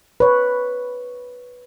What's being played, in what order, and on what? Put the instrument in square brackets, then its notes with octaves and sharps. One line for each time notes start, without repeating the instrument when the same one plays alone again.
[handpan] B4 C#5